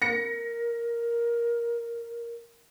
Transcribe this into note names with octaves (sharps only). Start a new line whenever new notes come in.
A#4 A#6 C#7